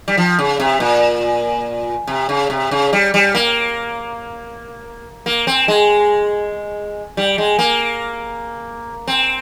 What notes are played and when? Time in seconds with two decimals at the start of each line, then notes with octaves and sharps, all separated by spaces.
0.08 G3
0.17 F3
0.39 C#3
0.60 C3
0.80 A#2
2.07 C3
2.29 C#3
2.50 C3
2.71 C#3
2.93 G3
3.14 G3
3.35 A#3
5.26 A#3
5.47 C4
5.68 G#3
7.17 G3
7.38 G#3
7.59 A#3
9.07 C4